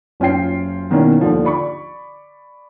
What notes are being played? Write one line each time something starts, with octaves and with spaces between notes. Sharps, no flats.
F#1 C#4 F4 G5 C7
B2 D#3 E3 A#3 C#4
D#2 D3 F3
D5 B5 C#6